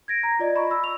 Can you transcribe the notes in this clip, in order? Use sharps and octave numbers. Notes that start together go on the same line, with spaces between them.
G#6 A#6 D7
A#5
F4 D5 D#5
B5 C#6
B5 E6
F7